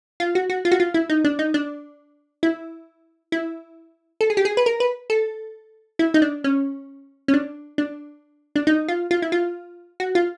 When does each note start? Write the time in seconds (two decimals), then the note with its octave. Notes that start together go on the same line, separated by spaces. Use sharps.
0.20 F4
0.35 F#4
0.50 F#4
0.65 F4
0.72 F#4
0.80 F4
0.94 E4
1.10 D#4
1.25 D4
1.39 D#4
1.54 D4
2.43 E4
3.32 E4
4.21 A4
4.30 G#4
4.37 G4
4.45 G#4
4.57 B4
4.66 A#4
4.80 B4
5.10 A4
5.99 E4
6.14 D#4
6.22 D4
6.44 C#4
7.28 C#4
7.34 D4
7.78 D4
8.56 D4
8.67 D#4
8.88 F4
9.11 F4
9.22 E4
9.32 F4
10.00 F#4
10.15 F4